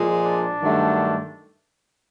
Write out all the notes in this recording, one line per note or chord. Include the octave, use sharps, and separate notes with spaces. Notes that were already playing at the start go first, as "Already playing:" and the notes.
Already playing: A#2 F3 G#3
D4
G2 D#3 F#3 A3